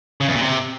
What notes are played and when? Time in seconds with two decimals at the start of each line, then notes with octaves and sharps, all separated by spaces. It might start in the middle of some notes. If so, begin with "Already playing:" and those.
0.21 C#3
0.28 E2
0.35 A#2
0.42 C3